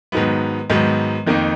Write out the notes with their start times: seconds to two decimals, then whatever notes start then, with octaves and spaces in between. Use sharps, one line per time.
0.12 G#2 D#3 F#3 B3
0.70 G#2 D#3 F#3 B3
1.26 F2 D#3 A#3 D#4